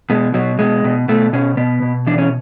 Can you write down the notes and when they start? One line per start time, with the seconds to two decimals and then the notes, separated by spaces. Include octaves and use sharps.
0.10 B2 G#3
0.34 B2 F#3
0.59 B2 G#3
0.84 B2
1.08 B2 A3
1.33 B2 C#4
1.57 B2 B3
1.82 B2
2.06 E3 D4
2.18 C#4